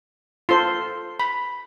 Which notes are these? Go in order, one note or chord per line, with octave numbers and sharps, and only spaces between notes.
F4 A4 C5 C6
B5